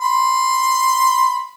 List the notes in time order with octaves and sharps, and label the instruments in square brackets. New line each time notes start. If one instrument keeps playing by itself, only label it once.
[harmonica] B5 C6